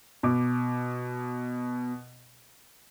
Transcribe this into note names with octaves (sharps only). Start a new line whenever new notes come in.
B2 D6